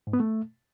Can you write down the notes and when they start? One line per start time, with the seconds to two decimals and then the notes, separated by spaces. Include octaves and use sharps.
0.07 G#2
0.13 B3
0.20 A3